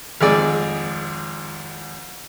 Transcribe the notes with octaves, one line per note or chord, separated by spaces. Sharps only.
G#1 F2 G#3 G#4 D5 E6